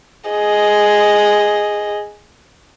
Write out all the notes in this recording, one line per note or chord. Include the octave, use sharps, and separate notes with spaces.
G#4 D#5